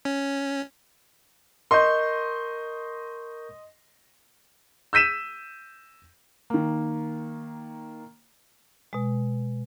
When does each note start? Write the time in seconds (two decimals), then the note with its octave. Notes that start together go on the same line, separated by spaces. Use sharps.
0.05 C#4
1.71 A#4 D#5 C6 C#6 G6
4.93 E6 G6 B6 D#7 E7
6.50 D#3 A#3
8.93 B2 G#3